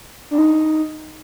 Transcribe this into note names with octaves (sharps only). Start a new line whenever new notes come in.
D4
D#4